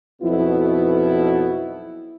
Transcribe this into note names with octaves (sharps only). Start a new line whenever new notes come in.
B1 F2 B2 B3 E4